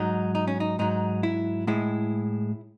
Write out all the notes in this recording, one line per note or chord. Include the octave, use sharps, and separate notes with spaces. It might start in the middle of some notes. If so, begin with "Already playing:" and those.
Already playing: G#2 F#3 D#4
D#4
C#4
D#4
G#2 F#3 D#4
E4
A2 G#3 E4